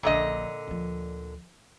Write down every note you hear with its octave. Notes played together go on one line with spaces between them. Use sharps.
D#1 A#1 A#2 D3 D#5
D2 F3